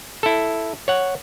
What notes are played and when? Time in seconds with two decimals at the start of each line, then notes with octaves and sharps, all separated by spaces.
0.23 E4 A4
0.88 C#5 F#5